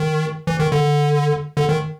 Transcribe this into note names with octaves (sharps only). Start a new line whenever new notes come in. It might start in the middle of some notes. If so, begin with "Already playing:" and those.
Already playing: D#3
E3
D#3
D3
D3
D#3